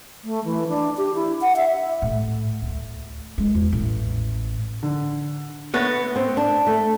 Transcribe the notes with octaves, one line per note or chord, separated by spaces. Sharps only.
A3
E3
D4
G4
E4
F#5
E5
A2
D2
G#3
E2
A1
D3
A3 B3 C#5 F#6 A6 A#6
C4
D4
A3